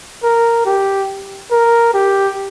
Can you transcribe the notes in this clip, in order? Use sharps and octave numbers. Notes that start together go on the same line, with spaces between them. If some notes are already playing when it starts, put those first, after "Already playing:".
A#4
G4
A#4
G4